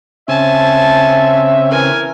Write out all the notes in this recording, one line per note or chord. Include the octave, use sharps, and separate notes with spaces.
C#3 C4 C#4 E5 G#5 A5
E3 A#4 G#5